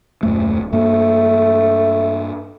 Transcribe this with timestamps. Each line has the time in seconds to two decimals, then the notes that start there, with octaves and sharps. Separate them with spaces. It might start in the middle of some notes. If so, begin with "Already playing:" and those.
0.23 D#1 F#2 A3
0.73 G2 A3 A#3